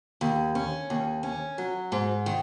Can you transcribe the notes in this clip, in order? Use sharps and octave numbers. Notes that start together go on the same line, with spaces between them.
D#2
C#4
D#2
C#4
F#3
G#2
D#3